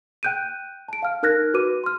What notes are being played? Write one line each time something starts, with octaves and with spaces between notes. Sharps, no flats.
G5 F#6 G6 D7 D#7
A5 D7
F5 F6
D#4 A#4 F6 F#6 G#6 A#6
F#4 B4 D6 D#7
C6 F6